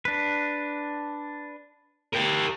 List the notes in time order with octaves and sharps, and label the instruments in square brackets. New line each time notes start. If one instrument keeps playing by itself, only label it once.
[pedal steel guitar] D4 B4
[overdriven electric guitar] G4 A#4